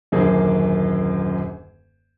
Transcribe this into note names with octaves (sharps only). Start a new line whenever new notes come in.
D#1 F#2 D3 A#3 G#4 C5